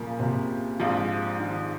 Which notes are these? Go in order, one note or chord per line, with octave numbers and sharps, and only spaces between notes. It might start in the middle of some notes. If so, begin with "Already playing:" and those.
Already playing: A#2 C#3 F3 A#3
C3
A#1 G#2 F3
D#3